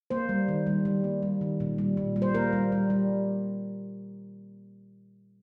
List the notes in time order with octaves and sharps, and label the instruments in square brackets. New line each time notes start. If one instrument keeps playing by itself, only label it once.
[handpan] A#3 C5
G3
D#3
G3
G3
A#3
G3
D#3
A#2
G3
A#2
G3
C5
A#3 A#4
G3
G3
G3